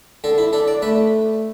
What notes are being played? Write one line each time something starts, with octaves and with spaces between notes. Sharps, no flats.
D3 A4
E4
D4 A4
D5
A3 B4